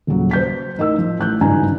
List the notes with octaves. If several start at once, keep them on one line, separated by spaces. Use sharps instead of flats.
D#1 C#3 F#3
C5 G6 B6
A1 D#4 A#4 E6
F3
A1 F#6 G6
G#1 G2 C#3 D#4 G#5 A#5